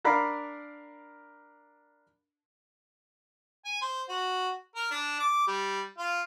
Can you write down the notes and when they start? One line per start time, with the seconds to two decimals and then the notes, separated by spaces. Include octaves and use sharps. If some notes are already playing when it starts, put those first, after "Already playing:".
0.04 D4 A#4 D5 F5 A#5 B5
3.65 G#5
3.81 C5
4.09 F#4
4.76 A#4
4.91 D4
5.20 D6
5.48 G3
5.98 F4